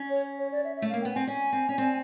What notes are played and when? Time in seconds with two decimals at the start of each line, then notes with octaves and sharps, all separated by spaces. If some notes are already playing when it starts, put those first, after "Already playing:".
Already playing: C#4
0.10 C#5
0.39 C#5
0.52 D5
0.64 E5
0.77 E5
0.82 A3
0.90 F5
0.94 A#3
1.02 B3 G5
1.14 C4 G#5
1.27 C#4 G#5
1.53 C4
1.69 C#4
1.78 C4